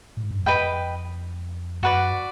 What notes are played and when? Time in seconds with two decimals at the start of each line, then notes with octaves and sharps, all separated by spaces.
0.17 A2
0.23 G#2
0.31 G2
0.39 F#2
0.46 F2 B4 D#5 G5 B5
1.83 F#2 F#4 B4 D5